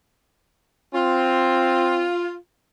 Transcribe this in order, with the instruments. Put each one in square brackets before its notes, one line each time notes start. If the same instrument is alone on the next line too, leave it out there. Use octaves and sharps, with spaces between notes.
[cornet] C4 [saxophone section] F4